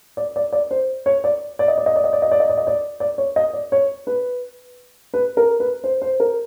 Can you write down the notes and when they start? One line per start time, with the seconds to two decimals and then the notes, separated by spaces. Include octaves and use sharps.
0.17 D5
0.36 D5
0.53 D5
0.71 C5
1.06 C#5
1.24 D5
1.59 D5
1.68 D#5
1.78 D5
1.86 D#5
1.96 D5
2.04 D#5
2.13 D5
2.22 D#5
2.32 D5
2.40 D#5
2.49 D5
2.57 D#5
2.67 D5
3.00 D5
3.18 C#5
3.36 D#5
3.53 D5
3.72 C#5
4.07 B4
5.14 B4
5.37 A#4
5.60 B4
5.84 C5
6.02 C5
6.20 A#4